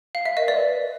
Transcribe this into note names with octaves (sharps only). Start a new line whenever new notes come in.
F5
E5
A#4 D#5
B4 D5
B4